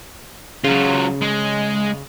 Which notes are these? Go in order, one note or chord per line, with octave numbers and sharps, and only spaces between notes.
C#3 F#3 F4
G#3